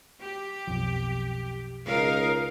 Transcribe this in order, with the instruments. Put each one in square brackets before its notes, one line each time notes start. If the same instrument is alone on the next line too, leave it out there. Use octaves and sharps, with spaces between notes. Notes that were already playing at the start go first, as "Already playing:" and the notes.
[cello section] G4
[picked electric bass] B1 F2 F3
[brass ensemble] C#2 [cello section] D#4 A#4 F5